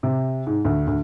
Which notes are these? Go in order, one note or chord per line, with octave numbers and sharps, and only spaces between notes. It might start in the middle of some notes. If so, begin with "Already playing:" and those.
C3
G#2
D2
D2